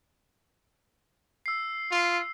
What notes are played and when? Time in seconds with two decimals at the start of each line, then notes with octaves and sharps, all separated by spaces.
1.46 E6 C7
1.91 F4